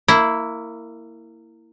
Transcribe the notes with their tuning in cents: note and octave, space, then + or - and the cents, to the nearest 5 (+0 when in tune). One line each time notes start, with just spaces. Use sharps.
A#3 -20 E4 +0